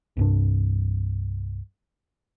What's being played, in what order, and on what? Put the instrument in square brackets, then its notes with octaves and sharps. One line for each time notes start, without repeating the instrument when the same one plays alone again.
[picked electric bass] C2 G2 D4